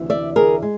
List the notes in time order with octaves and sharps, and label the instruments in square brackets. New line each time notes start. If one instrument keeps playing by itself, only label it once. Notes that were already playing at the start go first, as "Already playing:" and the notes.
Already playing: [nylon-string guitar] D2 C3 E3
D5 E5
G#4 A#4
G#3